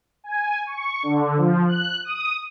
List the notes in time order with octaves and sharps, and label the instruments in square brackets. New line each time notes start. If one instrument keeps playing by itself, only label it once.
[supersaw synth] G#5
C#6
D3
F3
F#6
D#6